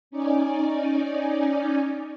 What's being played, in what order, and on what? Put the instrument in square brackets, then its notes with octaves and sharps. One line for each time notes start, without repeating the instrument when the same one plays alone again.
[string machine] C#4 D#4 D5 G#5